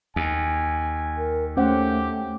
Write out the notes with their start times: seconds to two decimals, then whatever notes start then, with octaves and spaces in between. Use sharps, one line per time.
0.16 D#2 G#5
1.18 A#4
1.57 A3 C#4 G4 C5 F#5